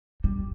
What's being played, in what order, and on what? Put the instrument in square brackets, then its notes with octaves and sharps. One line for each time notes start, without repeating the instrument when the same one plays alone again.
[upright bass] G3